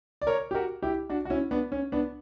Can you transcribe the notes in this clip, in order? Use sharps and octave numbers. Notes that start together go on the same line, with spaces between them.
D5
A#4 C#5
G4
F#4 A#4
E4 G4
D4 F#4
F#4
C#4 E4
B3 D4
C#4
B3 D4